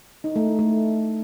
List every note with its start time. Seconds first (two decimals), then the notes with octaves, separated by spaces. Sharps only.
0.24 D#4
0.36 A3
0.47 E4
0.59 A3